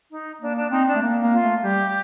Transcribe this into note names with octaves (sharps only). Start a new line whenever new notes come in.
D#4
A#3 D4
D4
C4 D#4
D4
A3
A#3
A#3
F4
A3
G3 G4